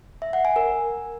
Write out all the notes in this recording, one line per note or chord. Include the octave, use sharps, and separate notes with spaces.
E5
F#5
G#5
A#4